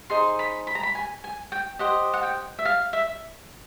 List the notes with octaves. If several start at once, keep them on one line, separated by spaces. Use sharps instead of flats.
D#4 G#4 C5 C6
B5
B5
A#5
B5
G#5
G#5
G5
G4 C5 D#5 F#5
F#5
G5
E5
F5
E5